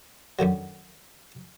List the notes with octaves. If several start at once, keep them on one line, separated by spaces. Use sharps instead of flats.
F#2 D3 D#3 F#3